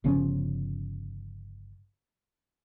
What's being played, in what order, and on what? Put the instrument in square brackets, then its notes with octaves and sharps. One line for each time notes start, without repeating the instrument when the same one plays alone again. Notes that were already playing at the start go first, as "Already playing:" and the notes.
[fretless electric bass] G1 C#3 F3 C#4